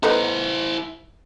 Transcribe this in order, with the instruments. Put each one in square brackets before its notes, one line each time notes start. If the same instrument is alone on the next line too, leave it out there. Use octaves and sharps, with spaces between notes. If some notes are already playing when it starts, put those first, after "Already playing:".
[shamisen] A3 B3 D#4 [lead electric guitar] E4 C5